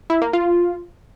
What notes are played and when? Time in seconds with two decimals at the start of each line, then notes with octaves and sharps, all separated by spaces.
0.10 E4
0.22 A#3
0.33 F4